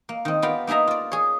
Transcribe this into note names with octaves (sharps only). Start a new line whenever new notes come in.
A#3
D#3 C4
B3 F4 G4 A#4 F5 G5
A#3 D#4 G#4 E5 A#5
F4 D5
G#4 C#5